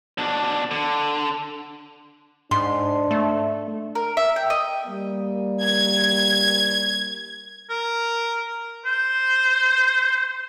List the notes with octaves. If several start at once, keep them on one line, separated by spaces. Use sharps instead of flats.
B2 D4
D3
G#2 D4 C6
A3
A#4
E5
G5
D#5
G3 A#3
G#6
A#4
C5